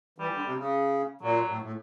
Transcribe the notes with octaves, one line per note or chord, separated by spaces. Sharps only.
E3 G3
D3
C3
C#3
A#2 F#3
A2
A2